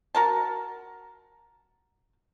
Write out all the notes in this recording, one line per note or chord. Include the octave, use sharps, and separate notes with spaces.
F#4 A#4 A5